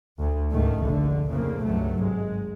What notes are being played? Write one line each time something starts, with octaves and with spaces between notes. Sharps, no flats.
D2
C#2 G#2 D#3 A3
F1 A#1 D3
F2 A2 C#3 F3 A#3
C#2 G2 C3 F#3 A3
G#1 G#3